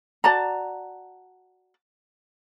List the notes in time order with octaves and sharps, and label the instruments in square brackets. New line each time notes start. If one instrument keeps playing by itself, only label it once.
[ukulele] F#4 D5 A5 A#5